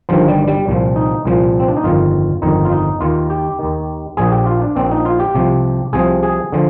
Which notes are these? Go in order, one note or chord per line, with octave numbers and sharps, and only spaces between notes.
G1 G2 D#3 F3
G3
G3
C2 A#2 F3
D#4
C2 A#2 F3
C4
D4
D#4
G1 F2 D#3 F4
G1 F2 D#3 D#4
F4
D#4
D#2 D#3 F4
G4
D#2 D#3
A#1 A#2 F3 G#4
G4
F4
D4
A#1 A#2 F3 C4
D#4
F4
G4
C2 C3 F3
C2 C3 F3 G#4
G#4
D3 F3